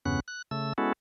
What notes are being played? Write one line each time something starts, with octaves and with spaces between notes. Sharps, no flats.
E2 G2 C#3 B3 C#4 F#6
F#6
C#3 A3 E6
G#3 B3 C#4 E4 F#4 A4